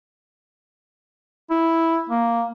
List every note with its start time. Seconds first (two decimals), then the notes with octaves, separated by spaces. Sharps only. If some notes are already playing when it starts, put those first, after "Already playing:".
1.50 E4
2.09 A#3